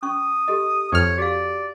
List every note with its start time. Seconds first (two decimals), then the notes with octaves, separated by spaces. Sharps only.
0.03 C#4 C#6 D#6
0.48 G4 A4 D#5
0.92 F2 C#5 F6
1.18 F#4 G4 D5 F5